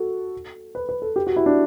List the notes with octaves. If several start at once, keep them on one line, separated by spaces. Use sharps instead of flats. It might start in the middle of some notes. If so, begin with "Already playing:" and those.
Already playing: F#4 A4
B4
B4
A4
G4
F#4
E4
D4